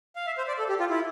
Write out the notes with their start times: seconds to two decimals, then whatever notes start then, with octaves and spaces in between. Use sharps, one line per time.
0.16 F5
0.27 E5
0.38 C5
0.48 D5
0.59 A4
0.69 G4
0.80 F4
0.90 E4